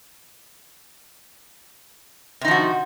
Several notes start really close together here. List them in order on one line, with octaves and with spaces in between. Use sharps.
C3 D#4 F3 F#4